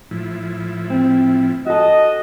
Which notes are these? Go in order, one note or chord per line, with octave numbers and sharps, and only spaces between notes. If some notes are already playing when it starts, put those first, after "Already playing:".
A2 F3 E4
C4
F#4 A4 D#5